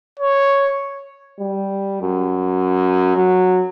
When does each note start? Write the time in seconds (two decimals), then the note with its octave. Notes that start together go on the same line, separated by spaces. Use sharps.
0.20 C#5
1.40 G3
2.02 F#2
3.16 F#3